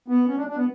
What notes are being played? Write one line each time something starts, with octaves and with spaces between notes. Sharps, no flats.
B3
C#4
D4
D4
B3